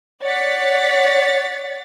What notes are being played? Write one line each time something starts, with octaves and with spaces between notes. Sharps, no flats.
C#5 D5 F#5 A6 B6